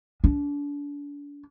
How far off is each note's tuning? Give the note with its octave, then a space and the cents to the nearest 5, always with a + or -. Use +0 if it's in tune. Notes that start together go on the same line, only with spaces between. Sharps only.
D4 -35